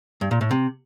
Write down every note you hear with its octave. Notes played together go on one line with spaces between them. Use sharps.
G2
A#2
A2
C3